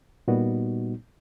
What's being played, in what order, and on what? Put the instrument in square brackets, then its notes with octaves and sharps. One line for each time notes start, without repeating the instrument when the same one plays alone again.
[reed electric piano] A#2 G3 B3 D#4 F#4